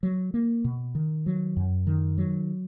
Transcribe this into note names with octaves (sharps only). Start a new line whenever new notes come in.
F#3
A#3
B2
D#3
F#3
F#2
D#3
F#3